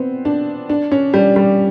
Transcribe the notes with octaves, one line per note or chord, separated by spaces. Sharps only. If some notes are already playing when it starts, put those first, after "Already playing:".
Already playing: B3 C4
D4
D4
C#4
G3
G3